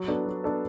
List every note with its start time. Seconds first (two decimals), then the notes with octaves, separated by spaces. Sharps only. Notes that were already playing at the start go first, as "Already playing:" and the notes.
Already playing: F#3
0.08 B3 D4 A4
0.26 F#3
0.44 B3 D4 A4